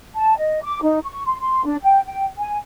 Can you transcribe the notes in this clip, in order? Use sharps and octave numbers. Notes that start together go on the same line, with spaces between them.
A5
D#5
D6
D#4
C#6
C6
C6
D4
G5
G5
G#5